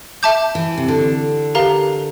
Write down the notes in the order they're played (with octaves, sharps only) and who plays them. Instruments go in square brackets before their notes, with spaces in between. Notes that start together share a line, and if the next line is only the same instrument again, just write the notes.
[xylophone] E5 A5 D6 G6
[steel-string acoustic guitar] E3
C3
D3
[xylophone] G4 A#4 F5 A#5